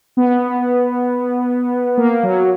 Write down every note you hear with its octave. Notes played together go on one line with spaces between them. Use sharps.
B3
A#3
F#3